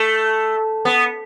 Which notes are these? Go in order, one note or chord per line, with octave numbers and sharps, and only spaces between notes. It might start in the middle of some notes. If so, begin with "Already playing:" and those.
Already playing: A3
B3